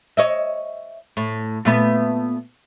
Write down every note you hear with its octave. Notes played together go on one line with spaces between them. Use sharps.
C#5 D#5 E5
A2
A#2 A3 B3